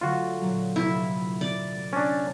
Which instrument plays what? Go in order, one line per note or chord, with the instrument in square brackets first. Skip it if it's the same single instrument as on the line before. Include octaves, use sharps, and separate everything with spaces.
[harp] D3 F#3 A3 [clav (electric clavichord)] F4 F#4
[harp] A#2 F#3
[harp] F1 A#3 [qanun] E4
[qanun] D5
[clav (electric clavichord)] C#4 D4 [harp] A6